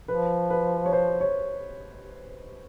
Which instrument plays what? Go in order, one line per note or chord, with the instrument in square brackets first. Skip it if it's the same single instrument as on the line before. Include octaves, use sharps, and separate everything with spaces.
[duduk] F3 [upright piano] B4
[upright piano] B4
C#5
C5
C#5